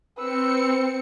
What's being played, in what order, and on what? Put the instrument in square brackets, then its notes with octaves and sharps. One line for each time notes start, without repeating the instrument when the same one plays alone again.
[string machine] C4 C#7 [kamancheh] B4 E6